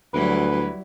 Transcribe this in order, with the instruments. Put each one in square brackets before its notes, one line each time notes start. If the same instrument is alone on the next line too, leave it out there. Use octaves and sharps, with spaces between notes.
[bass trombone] D2 [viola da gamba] F#3 G3 E4 [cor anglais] B4